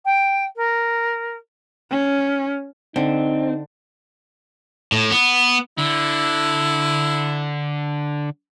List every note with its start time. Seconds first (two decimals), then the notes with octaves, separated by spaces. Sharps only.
0.05 G5
0.56 A#4
1.91 C#4
2.96 D3 C4 D#4
4.92 A2
5.11 B3
5.78 D3 E4